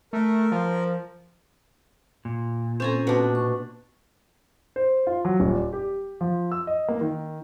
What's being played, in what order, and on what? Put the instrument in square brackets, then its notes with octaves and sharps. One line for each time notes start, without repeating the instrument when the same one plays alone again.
[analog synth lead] A3 [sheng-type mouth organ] A#4
[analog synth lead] F3
[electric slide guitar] A#2
[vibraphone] C4 C#4 A4 [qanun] C5 G#5 A#5
[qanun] B2 D4
[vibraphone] C#6
[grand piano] C5
F4
F#3
D#1
D5
G4
F3
E6
D#5
A#3
D#3